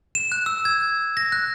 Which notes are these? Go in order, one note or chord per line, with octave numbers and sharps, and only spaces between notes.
E7
F#6
E6
G#6
A#6
F#6